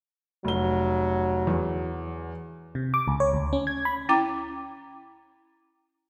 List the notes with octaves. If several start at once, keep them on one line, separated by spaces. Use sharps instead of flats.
F1 F#3 G7
E2
C3
D6
C#2
C#5
D2
C#4
G#6
B5
C#4 E4 G5 A#5 D6